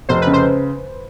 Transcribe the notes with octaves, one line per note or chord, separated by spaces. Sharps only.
F1 C5
B4
C#3
C5